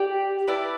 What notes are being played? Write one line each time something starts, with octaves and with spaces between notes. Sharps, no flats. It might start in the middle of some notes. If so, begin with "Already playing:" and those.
Already playing: G4 D5 G5
E4 B4 D5 A5